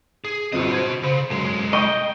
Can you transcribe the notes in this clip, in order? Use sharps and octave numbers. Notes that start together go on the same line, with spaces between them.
G#4
G1 C4 F#4 D#5
C5 G#6
C#3 C5
B1 F#2 G#3
D#5 G5 C#6 D#7